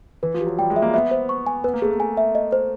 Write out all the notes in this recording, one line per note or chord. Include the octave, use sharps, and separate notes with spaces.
E3 B4
F3
G4
F#3
G3 G5
G#3
E5
A#3
B3 E5
C5
C#6
G#5
B3 B4
A#3
A3 G#4
A#3
G#5
E5
D#5
C5